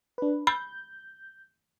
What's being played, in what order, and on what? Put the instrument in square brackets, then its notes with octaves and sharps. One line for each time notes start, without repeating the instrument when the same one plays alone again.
[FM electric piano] D4 B4
[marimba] B5 [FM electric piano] G6